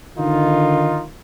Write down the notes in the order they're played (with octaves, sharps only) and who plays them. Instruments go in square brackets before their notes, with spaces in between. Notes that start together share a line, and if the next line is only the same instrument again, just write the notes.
[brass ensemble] D3 D#3 D#4 F4